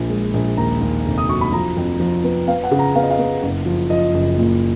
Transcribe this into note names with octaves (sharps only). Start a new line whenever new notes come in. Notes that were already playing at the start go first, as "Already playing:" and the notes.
Already playing: A#1 A#2
G#3
A#1
D#2 A#5
D#2
F1
D#6
F#3 C#6
B5
F3 A#5
F2
F3
B3
B3 F5
F#5
C#3
A#5
B3 F5
D#5
F5
B3
F#1
F3
F3 D#5
F#1
A#2